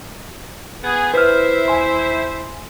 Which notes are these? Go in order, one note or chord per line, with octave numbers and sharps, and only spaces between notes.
B3 G#4
E4 B4 C5 E5 F6
D#2 G#5 C6